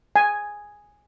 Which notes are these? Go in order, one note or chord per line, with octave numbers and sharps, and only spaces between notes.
G#5